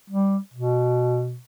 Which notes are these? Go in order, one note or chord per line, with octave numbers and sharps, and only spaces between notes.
G3
B2